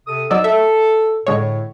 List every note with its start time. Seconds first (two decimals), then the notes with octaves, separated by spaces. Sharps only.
0.07 C3 A4 D#6
0.31 G#2 F#3 D5 D#5 E6
0.44 A4 E5
1.27 A2 D3 G#3 C#5